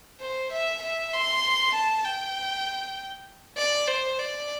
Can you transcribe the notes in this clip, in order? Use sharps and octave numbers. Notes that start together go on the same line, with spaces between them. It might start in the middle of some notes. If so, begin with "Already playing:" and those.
C5
E5
E5
C6
A5
G5
D5
C5
D5